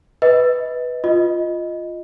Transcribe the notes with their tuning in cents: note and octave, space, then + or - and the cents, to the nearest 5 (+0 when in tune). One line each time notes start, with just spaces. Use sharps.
B4 +0 D#5 +25
F4 +0 D#5 +0